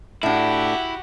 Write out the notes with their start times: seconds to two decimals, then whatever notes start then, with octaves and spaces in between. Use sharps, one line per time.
0.23 A2 D4 E4 F#4 G4 F#5